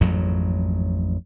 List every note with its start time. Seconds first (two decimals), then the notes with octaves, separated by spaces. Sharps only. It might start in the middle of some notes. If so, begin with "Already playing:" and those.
0.01 A1 F2 G#2 F#3